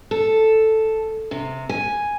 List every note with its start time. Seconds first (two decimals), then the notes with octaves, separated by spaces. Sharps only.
0.11 A4
1.31 C3
1.69 G#5